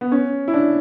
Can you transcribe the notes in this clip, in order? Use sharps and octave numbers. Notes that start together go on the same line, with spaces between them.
B3
C#4
E4
D4